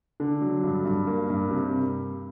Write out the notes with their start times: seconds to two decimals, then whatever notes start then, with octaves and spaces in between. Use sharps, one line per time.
0.20 D3
0.41 F#3
0.63 G2
0.85 G2
1.07 A#3
1.30 G2
1.51 C3